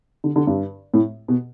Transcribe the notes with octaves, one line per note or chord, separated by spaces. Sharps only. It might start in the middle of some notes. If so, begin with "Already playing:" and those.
D3
D3
G2
A2
B2